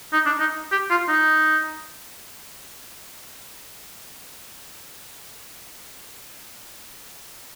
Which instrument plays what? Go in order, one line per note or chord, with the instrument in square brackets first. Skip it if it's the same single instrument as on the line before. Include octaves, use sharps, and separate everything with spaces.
[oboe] D#4
D4
D#4
G4
F4
D#4